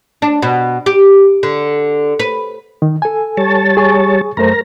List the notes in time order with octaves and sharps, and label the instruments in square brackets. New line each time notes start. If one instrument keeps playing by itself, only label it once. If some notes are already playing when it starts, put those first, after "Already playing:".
[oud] D4
B2
G4
D3
B4
[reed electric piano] D#3
A4 G#5
[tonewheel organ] G3 C#5 A5
[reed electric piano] G#4 G#5 C#6
[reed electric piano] F#2 A3 C5 [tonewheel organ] A#4 A#5